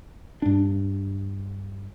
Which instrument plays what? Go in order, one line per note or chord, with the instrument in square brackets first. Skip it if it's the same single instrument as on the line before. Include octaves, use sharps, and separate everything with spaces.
[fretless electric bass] G2 D4